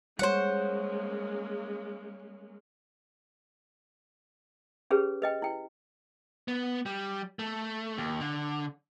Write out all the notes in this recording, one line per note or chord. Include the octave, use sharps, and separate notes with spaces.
G3 G#3 A#3 C#4 C5 C#5 F#5
C#4 G4 G#4 B4 C#5
B4 D#5 G5
E4 G5
B3
G3
A3
D#2
D3